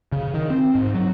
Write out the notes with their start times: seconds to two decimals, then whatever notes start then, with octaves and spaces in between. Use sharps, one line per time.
0.12 C#3
0.34 D#3
0.50 C4
0.75 G#2
0.94 F#3